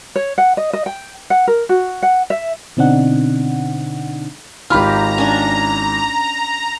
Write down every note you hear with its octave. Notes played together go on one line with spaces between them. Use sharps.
C#5
F#5
D#5
D#5
G5
F#5
A#4
F#4
F#5
E5
B2 D3 C4 D4 D#4 F#5
G#1 F4 G4 A#5 B5 F6
C#4 D4